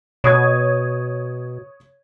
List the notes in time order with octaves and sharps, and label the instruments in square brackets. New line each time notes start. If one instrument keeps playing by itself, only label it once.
[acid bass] B2 [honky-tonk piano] C#5 D#6 G#6